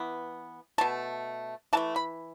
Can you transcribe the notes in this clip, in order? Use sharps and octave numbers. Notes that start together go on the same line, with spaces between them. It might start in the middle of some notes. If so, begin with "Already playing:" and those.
Already playing: E3 B3
B2 A3 A5
E3 A3 A5
B5